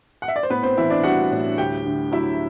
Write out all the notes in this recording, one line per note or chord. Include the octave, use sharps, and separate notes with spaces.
F#5
E5
D5
C5
A2 B3 B4
C4 C5
E3 E4 E5
D4 D5
G3 F#4 F#5
A2
D2 G4 G5
D3
F#3 E4 E5